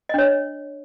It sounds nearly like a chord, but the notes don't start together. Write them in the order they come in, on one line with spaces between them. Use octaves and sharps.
D#5 D4 C#5